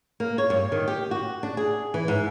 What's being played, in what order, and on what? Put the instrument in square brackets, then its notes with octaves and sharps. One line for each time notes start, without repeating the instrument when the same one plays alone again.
[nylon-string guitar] A#3
C#5
G2
D#3
G4
F#4
D4
G#4
E3
G#2